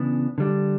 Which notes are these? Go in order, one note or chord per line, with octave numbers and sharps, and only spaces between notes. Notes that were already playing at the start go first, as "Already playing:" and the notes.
Already playing: C#3 E3 B3 D4
D3 G3 D4